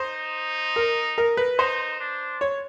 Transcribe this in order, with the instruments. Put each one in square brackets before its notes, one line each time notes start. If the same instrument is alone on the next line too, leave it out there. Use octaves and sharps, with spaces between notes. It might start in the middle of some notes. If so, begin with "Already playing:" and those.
Already playing: [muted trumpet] D#4 [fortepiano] C5
[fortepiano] A#4
A#4
B4
[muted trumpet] D#4 [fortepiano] C5
[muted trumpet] D4
[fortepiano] C#5